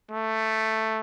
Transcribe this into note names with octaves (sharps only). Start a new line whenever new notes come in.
A3